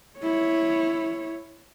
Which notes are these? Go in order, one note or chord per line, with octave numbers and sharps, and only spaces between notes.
E4 C#5